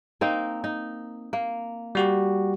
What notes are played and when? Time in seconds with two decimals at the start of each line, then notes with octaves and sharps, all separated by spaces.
0.21 A#3 C4 D#4
0.64 D#4
1.33 A#3
1.95 G3 F#4 G4